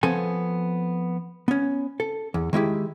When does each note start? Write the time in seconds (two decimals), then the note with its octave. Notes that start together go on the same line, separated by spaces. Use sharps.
0.03 F3 B3 C4 A4 G#5
1.48 B3 C#4
2.00 A4
2.34 E2
2.53 D#3 G#3 E4 G4